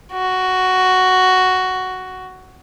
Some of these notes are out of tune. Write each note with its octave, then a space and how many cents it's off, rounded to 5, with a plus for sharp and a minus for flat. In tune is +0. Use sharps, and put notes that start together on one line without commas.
F#4 +5